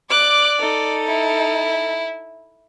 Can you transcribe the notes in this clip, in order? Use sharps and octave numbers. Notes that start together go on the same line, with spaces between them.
D5 D6 F#6
D#4 A4
E4